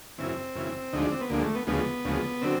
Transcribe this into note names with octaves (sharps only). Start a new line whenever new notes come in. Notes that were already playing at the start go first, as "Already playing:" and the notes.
F#2 C#3 E3 C4
F#2 C#3 E3
D2 D3 F3 G#3 D#4
D4
C4
B3
D2 D3 F3 G#3 A#3
A3
B3
D2 C#3 F3 G#3 B3
D2 C#3 F3 G#3
D3 F#3 C4